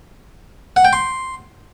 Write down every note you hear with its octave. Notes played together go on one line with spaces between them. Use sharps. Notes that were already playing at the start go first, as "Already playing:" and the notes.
F#5
G5
C6